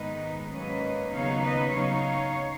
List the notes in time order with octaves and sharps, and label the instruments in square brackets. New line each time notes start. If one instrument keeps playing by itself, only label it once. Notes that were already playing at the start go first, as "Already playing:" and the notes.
Already playing: [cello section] G#2 D#3 G#3 B3 D#4 B4 D#5
G#2 F#3 A#3 C#4 B4 D#5
D#2 C#3 F#3 B3 D#4 C#5 F5
B4 D#5
C#3 F#3 B3 D#4 C#5 F5